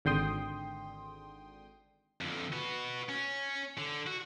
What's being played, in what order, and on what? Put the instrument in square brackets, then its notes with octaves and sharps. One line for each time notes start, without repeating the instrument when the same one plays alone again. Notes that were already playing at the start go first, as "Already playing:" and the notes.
[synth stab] G#1 D3 G5 C6 D#6
[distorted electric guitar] F2 D3
F#4 B4
C#4
D3
F#4